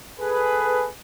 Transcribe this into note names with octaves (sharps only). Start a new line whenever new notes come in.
G#4 A4 B4